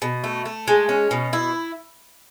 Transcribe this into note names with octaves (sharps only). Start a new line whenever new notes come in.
B2
A3
A3
G#3
C#4
B2
E4